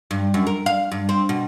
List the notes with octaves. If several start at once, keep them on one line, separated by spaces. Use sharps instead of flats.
G2
F#2
A#4
F5
G2
C4
B2